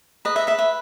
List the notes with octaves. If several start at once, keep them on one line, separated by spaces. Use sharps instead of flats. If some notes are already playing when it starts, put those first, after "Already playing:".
B4 D#5
E5
B4 E5
E5